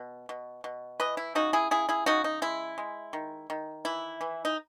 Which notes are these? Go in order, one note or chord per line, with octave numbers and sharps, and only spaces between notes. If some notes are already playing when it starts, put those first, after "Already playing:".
Already playing: B2
B2
B2
E3 B4 D#5
E4
C#3 D#4 F#4
E4 G#4
C#3 E4 G#4
E4 G#4
C#3 D#4 F#4
D#4
G#3 E4
G#3
D#3
D#3
E3 E4
E3
D#4